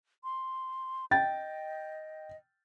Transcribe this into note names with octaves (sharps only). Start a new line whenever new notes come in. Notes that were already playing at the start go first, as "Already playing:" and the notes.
C6
D#5 G5 A6